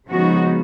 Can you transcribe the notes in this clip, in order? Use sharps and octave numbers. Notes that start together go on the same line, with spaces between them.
C#3 F3 G#3 B3 D#4 F#4